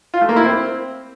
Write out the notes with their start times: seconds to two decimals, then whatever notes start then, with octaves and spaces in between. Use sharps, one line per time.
0.14 F4
0.21 A3
0.29 A#3
0.36 E4
0.44 C4